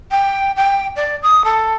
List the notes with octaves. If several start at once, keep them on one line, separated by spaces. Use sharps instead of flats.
G5
G5
D5
D#6
A4